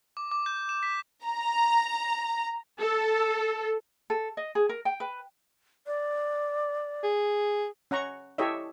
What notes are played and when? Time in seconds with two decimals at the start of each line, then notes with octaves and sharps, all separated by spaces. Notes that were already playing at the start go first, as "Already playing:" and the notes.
0.17 D6
0.31 D6
0.46 G6
0.69 E7
0.83 B6
1.25 A#5
2.79 A4
4.10 A4
4.37 D#5
4.55 G#4
4.69 A#4
4.85 G5
5.00 B4
5.87 D5
7.03 G#4
7.91 C#4 F#5 A#5 C#6
8.38 E4 G4 A4 C#5 D#5 E5